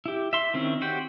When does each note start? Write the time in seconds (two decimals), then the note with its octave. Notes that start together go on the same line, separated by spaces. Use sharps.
0.06 E4 G4
0.33 E5 C6
0.54 D#3 C4 C#4 E4
0.81 F#4 G4 C5 G5